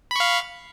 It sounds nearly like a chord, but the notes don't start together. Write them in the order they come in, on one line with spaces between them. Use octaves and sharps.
B5 C#6 F5